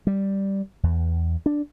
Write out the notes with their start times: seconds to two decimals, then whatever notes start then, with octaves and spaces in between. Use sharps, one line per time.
0.07 G3
0.83 E2
1.46 D4